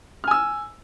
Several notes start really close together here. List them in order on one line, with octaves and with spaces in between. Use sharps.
F6 G#5 E6